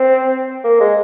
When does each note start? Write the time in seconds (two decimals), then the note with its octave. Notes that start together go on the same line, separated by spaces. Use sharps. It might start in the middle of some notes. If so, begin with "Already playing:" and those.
Already playing: C4
0.64 A#3
0.80 G#3